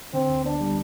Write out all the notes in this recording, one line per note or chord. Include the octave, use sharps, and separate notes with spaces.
D3 C4
D2
B3 D4
G3